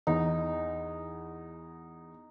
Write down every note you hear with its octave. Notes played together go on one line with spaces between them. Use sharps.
E2 D#4